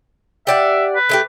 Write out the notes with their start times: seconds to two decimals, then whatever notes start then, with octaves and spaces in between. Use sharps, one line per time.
0.47 G4 D5 E5 F#5
0.96 B4
1.09 D3 A3 G4